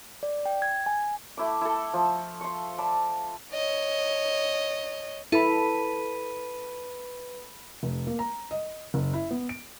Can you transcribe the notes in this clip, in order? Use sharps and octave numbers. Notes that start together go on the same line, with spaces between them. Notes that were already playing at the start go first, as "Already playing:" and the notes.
D5
G5
G#6
G#5
A3 E4 D6
E4 A4
F3
C6 C#6
D5 A5 B5
C#5 D#5
E4 A4 B4 B5 B6 D#7
F1
A#3
A#5
D#5
F#1
E4
B3
D7